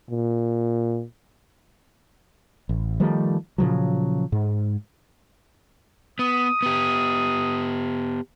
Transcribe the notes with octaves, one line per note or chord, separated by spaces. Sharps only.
A#2
A1
D#3 F3 G3 A3
A#2 C#3 F3 F#3
G#2
B3 D#6
B3 G4